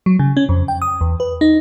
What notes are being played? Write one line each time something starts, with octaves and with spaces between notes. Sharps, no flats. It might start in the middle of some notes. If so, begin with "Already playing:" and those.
F#3
C#3
C#4
F2
G5
D#6
E2
B4
D#4